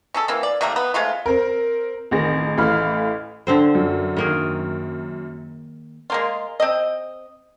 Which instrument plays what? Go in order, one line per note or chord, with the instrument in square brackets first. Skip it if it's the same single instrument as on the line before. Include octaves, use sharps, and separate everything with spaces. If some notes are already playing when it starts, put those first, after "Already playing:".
[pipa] C#4 G#4 A4
E3 A#3 C4
D5
C3 D#3 A3 A#3
B3
G#3 A3 C4 F4
[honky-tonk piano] C4 A#4
A1 F2 D#3 G#4 A#6
A1 E3 A3 F5 B5 F6
[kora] D3 C4 C5
[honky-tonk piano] F#2
[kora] D#3 A#3 G#4
[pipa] G#3 A#3 F4
C4 D#5